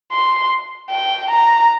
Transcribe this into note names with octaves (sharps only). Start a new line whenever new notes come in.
C6
G5
A#5